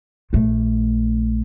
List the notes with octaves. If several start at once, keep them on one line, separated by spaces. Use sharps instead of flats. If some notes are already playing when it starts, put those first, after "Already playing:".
A#1 A3